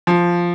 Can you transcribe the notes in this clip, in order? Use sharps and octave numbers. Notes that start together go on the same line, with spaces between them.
F3